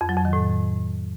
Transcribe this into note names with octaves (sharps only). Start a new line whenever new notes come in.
F2
F#3
F2
D#3
A2